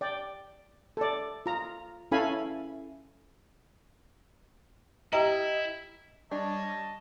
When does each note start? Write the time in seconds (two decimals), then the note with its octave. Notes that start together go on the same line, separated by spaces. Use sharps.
0.01 D5 G5
0.97 A4 D5
1.46 F4 A#5
2.12 C#4 E4 A4 F5 G#5 B5
5.13 E4 G4 D#5 G5 A#5
6.31 G3 D4 C#5 D#5 A5